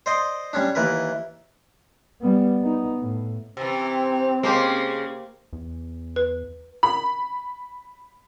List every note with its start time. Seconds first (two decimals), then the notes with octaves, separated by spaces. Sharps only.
0.06 C5 D5 D#5 C6
0.53 G3 C#4 D4
0.75 D#2 E3 A#4 B4
2.21 G3 B3
2.63 B3 D#4
3.01 A2
3.57 C3 E3 C4
4.43 C#3 G#3 A#3 G4 C5
5.53 E2
6.16 B4
6.83 B5